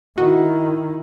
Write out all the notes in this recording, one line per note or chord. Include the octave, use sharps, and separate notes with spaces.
D#3 E4 F#4 D#5